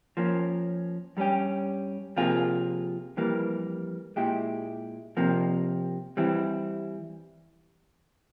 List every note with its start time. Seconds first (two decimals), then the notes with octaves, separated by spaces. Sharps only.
0.17 F3 A#3 C#4
1.17 G2 G3 C#4 G4
2.17 C3 F3 A#3 F4 G#4
3.17 F2 E3 G3 A#3
4.16 A#2 G#3 E4 G4
5.17 F2 C3 F3 A#3
6.17 E3 G3 C4 E4